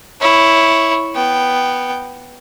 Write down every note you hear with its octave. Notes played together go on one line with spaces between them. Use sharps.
E4 C#5
B3 G5